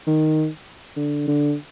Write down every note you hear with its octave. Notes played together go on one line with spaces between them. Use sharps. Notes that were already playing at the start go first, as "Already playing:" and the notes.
D#3
D3
D3